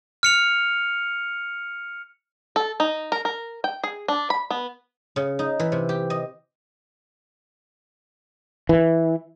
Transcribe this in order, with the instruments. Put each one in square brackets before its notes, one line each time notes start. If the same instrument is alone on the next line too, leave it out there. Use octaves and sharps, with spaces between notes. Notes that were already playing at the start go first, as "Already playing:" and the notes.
[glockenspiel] F6 C#7 F7
[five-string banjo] A4
D#4
A#4
A#4
G5
G#4
D4
B5
B3
[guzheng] C#3
D#4
E3
C3
G4
D#5
[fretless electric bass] E3